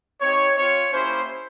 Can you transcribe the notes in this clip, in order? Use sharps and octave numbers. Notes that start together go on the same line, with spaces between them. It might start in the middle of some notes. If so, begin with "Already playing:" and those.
C4 D#4 G4 C#5
C4 F4 C#5
A#3 C#4 E4 G4 C5